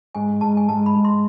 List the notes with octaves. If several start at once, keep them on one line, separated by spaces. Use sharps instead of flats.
G#2 G#5
G#2 A5
G#5
G#2 A5
B5
G#2
C6